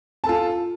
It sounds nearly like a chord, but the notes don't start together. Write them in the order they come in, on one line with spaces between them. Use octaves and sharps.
A5 A4 F4